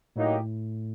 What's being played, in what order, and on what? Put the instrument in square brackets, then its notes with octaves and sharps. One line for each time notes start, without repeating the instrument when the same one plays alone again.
[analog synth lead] A2 [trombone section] F#3 A#3 D#4 G4